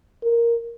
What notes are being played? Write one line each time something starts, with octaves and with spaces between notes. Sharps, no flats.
A#4